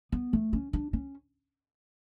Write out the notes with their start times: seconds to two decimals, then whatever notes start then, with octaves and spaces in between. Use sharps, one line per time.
0.12 B3
0.33 A3
0.53 C#4
0.73 D4
0.93 C#4